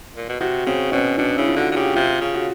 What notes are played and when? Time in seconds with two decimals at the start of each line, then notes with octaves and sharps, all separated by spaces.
0.17 A#2
0.29 B2
0.41 C3 F#4
0.67 C#3 C4
0.91 B2 C#4
1.17 B2 D4
1.37 C#3 E4
1.48 F4
1.56 D3 F#4
1.72 D3
1.76 C#3 G4
1.95 C3 F4
2.21 C#3
2.34 F#4